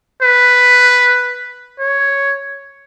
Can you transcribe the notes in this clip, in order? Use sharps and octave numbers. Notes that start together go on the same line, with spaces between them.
B4
C#5